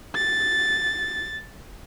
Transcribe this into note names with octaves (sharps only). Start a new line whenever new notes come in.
A6